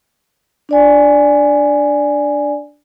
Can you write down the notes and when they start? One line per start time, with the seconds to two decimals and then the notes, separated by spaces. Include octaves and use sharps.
0.69 D4 D5 G#5